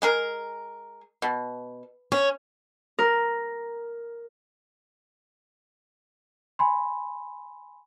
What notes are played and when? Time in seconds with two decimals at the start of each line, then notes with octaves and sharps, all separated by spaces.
0.02 G#3 G#4 A#4
1.22 B2
2.12 C#4 C#5
2.99 A#4
6.59 G#5 B5 C6